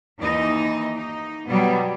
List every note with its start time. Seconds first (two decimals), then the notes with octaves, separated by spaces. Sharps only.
0.19 D#2 E3 D#4 D#5
0.96 D#4
1.47 B2 F#3 G3 B3